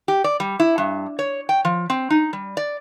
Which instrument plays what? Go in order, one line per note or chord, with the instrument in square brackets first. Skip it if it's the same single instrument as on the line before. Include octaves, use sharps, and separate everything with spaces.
[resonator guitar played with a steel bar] G4
D5
G3
E4
G2
C#5
G5
F3
C4
D#4
G3
D5